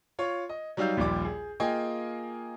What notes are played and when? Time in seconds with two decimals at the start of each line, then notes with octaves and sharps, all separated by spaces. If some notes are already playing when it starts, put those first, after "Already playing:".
0.19 F4 C#5 C#6
0.49 D#5
0.77 F#3 G3 D#4 F5 E6 G6
0.97 A#1 D#2 A#2 G3 D6
1.25 G#4
1.60 A#3 F4 G#4 D#5 G5 G#5